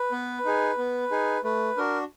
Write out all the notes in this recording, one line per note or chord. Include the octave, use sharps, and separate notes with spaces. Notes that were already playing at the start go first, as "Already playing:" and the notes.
Already playing: B4
B3
D#4 G#4
B3
D#4 G#4
A3 B4
D4 F#4 A#4